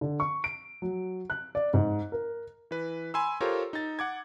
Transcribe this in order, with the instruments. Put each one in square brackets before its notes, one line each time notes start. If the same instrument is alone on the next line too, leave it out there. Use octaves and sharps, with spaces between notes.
[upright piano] D3
C#6
D7
F#3
F#6
D5
G#2
A#4
[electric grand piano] E3 B4
G#5 B5 C6 E6
F4 G4 A4 A#4 C5 C#5
D#4 A6
F#5 D6 G#6